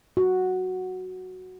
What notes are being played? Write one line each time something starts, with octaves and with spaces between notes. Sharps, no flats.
F#4